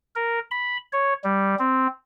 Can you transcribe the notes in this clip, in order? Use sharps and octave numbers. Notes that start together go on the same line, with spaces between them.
A#4
B5
C#5
G3
C4